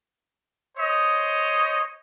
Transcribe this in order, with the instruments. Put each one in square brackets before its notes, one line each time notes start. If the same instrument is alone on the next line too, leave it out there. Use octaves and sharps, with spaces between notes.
[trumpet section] C5 C#5 D#5